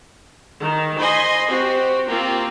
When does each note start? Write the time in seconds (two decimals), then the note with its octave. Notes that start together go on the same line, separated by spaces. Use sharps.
0.62 D#3
1.00 C5 D#5 G#5 B5 C6
1.50 C4 F#4 G4
2.08 A#3 C4 F4 G4